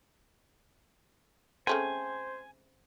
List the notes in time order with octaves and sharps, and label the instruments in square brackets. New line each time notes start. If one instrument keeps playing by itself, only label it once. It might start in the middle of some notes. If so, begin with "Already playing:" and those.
[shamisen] C#3 A3 C4 [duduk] C5 [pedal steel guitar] G#5